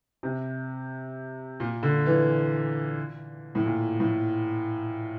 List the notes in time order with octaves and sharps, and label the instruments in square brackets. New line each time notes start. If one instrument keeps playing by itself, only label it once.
[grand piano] C3
A#2
D3
E3
A2
A#2
A2